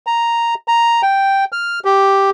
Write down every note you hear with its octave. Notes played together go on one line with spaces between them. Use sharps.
A#5
A#5
G5
F6
G4